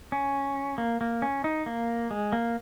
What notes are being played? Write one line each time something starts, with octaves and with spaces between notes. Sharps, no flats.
C#4
A#3
A#3
C#4
D#4
A#3
G#3
A#3